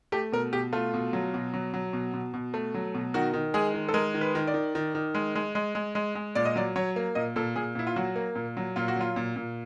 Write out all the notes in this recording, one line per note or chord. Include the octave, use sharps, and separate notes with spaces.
A3 G4
B2 A#4
B2 G4
A3 F4
B2
F#3
B2
F#3
F#3
B2
B2
B2
A3
F#3
B2
D#3 F#4
D#3
G#3 G#4
D#3
A4
G#3 A#4
D#3
B4
D#3
D5
D#3
D#3
D#3
G#3
G#3
G#3
G#3
G#3
G#3
A#2 D5
D#5
F#3 D5
F#3 C#5
A#3
A#2 D#5
A#2 A4
A#2 G#4
A#2 E4
F4
F#3 F#4
A#3
A#2
F#3
A#2 F4
F#4
F#3 F4
A#2
A#2